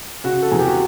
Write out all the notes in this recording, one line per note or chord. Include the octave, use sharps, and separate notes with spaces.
C#3 F#4
A4
E2 G#4
G4
F#4